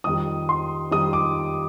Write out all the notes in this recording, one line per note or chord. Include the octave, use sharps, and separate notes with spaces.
F2 D#3 G3 D#6
C6
F2 D#3 G3 D#6
D6